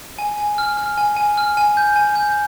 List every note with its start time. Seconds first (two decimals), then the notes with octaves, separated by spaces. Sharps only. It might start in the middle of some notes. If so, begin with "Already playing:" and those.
0.19 G#5
0.38 G#5
0.58 F6
0.77 F6
0.98 G#5
1.17 G#5
1.38 F6
1.57 G#5
1.77 G6
1.96 G#5
2.16 G6